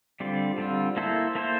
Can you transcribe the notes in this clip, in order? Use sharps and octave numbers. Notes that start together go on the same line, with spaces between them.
D3 G3 C4 F4
D3 G3 C4 F4
A#3 E4 A4 C5
A#3 E4 A4 C5